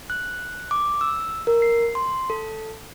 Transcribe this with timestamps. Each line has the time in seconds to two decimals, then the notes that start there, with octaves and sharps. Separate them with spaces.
0.10 F#6
0.71 D6
1.01 E6
1.47 A#4
1.62 C7
1.95 C6
2.30 A4